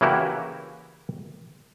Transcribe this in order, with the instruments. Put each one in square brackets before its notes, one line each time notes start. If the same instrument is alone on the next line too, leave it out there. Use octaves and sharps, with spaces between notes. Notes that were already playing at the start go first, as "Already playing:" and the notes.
[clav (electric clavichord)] C#3 E3 A#3 E4 F#4 G4